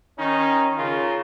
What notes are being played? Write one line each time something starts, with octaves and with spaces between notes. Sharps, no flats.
D#3 C#4 D#4
C#3 F4 A#4